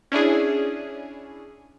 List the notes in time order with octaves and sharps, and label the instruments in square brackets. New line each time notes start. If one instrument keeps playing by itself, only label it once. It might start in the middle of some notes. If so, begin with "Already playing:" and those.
[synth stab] C#4 D4 E4 G#4